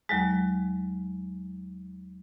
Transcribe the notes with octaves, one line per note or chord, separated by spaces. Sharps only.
D#2 F#3 G#3